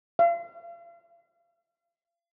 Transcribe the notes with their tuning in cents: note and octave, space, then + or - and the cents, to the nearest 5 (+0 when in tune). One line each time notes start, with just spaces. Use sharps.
F5 -40